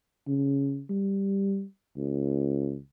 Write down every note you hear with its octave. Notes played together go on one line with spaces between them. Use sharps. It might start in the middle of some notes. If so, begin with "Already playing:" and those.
C#3
G3
C#2